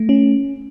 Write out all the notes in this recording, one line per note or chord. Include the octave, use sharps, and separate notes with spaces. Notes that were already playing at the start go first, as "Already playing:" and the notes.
Already playing: A3
C#4